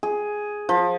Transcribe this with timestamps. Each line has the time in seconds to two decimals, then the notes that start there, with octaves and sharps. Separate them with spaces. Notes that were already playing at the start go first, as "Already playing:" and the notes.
0.03 G#4
0.69 F3